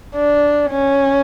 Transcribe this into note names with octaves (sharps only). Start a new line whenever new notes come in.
D4
C#4